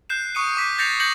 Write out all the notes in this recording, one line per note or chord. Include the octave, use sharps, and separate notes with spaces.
F#6 G6 C7 E7
C#6 D#6 C#7 D#7
D6 B6
G6 A6 A#6 C7 C#7 F7
G6 A#6 C#7 F#7